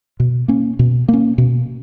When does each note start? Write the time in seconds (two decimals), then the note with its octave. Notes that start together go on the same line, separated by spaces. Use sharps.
0.20 B2
0.48 A#3 C#4
0.79 B2
1.09 A#3 C#4
1.38 B2